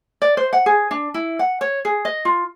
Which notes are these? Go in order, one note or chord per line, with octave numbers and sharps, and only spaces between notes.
D5
C5
F#5
G#4
D4
E4
F#5
C#5
G#4
D#5
F4